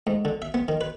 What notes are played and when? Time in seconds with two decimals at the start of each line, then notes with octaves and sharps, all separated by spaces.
0.07 G#2
0.25 D3
0.42 E5
0.54 B3
0.68 D#3
0.81 B4